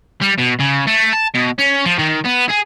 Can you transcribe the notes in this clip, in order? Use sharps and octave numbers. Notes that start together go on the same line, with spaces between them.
G3
B2
C#3
A3
A5
B2
C#4
F3
D#3
B3
G#4